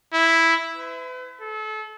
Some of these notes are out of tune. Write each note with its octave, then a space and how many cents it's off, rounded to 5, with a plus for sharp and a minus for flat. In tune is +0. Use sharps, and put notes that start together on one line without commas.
E4 +0
B4 +40
A4 -30